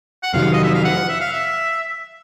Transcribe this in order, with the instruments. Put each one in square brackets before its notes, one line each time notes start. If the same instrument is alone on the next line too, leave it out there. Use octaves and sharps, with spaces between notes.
[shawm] F#5
[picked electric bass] F2 C3 D#3 F#3 [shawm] F5
[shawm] D#5
E5
F5
F#5
E5
F5
E5